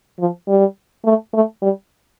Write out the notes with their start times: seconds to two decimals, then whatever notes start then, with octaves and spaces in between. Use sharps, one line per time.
0.19 F3
0.48 G3
1.05 A3
1.33 A3
1.62 G3